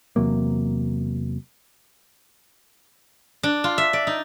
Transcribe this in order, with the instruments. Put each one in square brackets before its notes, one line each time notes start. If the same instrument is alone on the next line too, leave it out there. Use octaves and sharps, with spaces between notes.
[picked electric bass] E2 C3 F#3 A#3
[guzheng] D4
F4
E5
D5
D#4